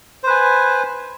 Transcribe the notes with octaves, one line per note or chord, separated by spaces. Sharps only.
B4 C5 G#5